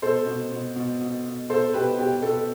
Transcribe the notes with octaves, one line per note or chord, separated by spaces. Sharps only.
B2 A4 C5
B2
B2
B2
B2
B2
B2 A4 C5
B2 G4 B4
B2 G4
B2 A4